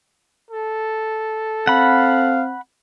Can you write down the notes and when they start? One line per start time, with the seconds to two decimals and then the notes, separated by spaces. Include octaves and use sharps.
0.51 A4
1.67 C4 F5 F#5 B5